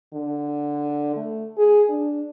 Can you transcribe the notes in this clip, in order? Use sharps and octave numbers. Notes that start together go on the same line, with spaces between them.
D3
A3
G#4
D4